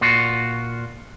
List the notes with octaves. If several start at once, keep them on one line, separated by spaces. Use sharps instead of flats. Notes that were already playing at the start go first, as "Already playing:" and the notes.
A#2 F4 F#4